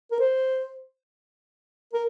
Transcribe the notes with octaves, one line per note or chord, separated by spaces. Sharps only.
A#4
C5
A#4